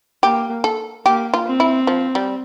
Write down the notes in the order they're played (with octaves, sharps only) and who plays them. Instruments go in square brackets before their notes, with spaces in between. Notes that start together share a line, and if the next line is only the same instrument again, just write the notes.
[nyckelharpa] A#3 [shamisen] G4
[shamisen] A4
[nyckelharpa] A#3 [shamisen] G4
[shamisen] F4
[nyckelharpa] C4
[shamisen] E4
F3
G3